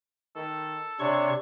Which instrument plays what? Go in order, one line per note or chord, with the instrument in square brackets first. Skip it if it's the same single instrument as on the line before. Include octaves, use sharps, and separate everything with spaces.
[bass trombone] D#3 [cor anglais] A4
[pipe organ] C3 C#5 C#6 [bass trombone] D4